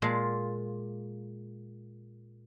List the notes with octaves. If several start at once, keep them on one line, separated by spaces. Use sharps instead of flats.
A#2 G#3 F4